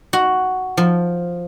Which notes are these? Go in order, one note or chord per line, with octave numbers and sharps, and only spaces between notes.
F#4
F3